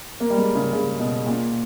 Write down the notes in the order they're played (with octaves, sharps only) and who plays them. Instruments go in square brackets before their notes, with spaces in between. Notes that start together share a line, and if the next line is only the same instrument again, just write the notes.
[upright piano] A#3
G3
G#3
C#3
C#3
B2
A#2